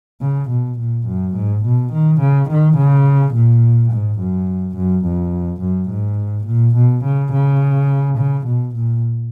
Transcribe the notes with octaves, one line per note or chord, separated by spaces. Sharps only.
C#3
B2
A#2
F#2
G#2
B2
D#3
C#3
D#3
C#3
A#2
G#2
F#2
F#2
F2
F#2
G#2
A#2
B2
C#3
C#3
C#3
B2
A#2